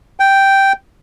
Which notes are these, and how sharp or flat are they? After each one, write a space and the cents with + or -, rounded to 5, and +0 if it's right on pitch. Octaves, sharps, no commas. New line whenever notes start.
G5 -5